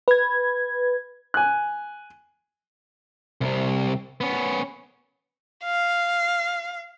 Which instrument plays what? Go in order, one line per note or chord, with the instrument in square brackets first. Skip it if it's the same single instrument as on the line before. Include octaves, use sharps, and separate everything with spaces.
[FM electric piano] B4 G#6
[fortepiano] G#5 F#6
[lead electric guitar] C2 C3
B3 C#4
[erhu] F5